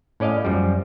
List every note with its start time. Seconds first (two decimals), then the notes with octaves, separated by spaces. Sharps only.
0.20 A2 C#4 D5 D#5 F5
0.45 F#2 F3 G3